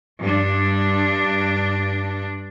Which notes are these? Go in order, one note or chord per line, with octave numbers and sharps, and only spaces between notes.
G2 D4